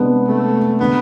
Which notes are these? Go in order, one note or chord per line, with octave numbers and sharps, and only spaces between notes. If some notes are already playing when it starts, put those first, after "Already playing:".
Already playing: C3 G#3 B3 D4
A3
D3 G#3 B3